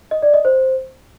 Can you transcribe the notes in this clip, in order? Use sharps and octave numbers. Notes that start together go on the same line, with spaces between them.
D#5
D5
D#5
C5